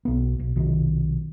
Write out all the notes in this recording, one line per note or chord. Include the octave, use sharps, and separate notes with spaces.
B1 B3
B1
B1 C3 D#3